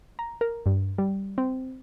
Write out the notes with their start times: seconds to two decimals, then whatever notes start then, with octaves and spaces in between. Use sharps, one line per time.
0.19 A#5
0.41 A#4
0.66 G2
0.98 G3
1.38 C4